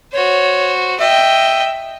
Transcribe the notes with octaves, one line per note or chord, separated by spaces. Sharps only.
F#4 C5 C#5
D#5 E5 G5